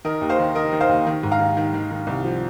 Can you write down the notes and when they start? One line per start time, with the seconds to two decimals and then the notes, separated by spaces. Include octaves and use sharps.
0.05 D#3 A#4 D#5
0.21 D#2
0.30 C5 F5
0.39 D#3
0.55 D#3 A#4 D#5
0.73 D#3
0.81 C5 F5
0.89 D#2
1.07 D#3
1.23 G#2
1.31 F5 A#5
1.39 D#3
1.57 D#3
1.74 D#3
1.91 D#3
2.07 C2
2.25 F3